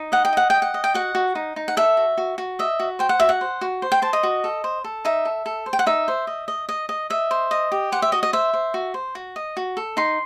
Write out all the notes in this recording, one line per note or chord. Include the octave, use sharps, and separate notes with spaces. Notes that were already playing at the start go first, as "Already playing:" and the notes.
Already playing: D#4
D#5 F#5
G5
D#5 F#5
D#5 G5
F#5
D#5
G5
F#4 F#5
F#4
D#4
D#4
F#5
A4 E5
F#4
F#4
F#4
D#5 E5
F#4
C5 G5
F#5
F#4 E5
F#5
C5
F#4
C5
G5
C5 A5
D#5
F#4
A4
C5
A4
D#4 E5
A4
A4
C5
G5
F#5
D#4 E5
C5
D#5
D#5
D#5
D#5
D#5 E5
C5
D#5
G4
C5 F#5
E5
F#4 D#5
D#5
C5 E5
C5
F#4
C5
F#4
D#5
F#4
A4
D#4 C6